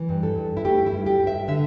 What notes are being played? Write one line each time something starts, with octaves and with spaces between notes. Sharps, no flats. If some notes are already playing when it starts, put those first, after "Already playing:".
Already playing: E3
G2
A4
G2
E4
A3 G4
E4
G2
G4
G2
E5
D3 E5